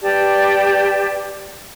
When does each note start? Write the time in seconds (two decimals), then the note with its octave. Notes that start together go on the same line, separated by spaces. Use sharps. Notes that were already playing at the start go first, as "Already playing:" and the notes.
0.01 G4 B4 D5 A5